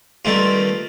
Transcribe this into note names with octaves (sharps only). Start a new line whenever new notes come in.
G2 D#3 A3 C4 F4